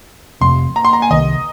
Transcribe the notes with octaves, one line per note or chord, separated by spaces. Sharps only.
F1 F2 C3 C6
A#5
C6
A#5
G#5
C2 C3 D#3 D#5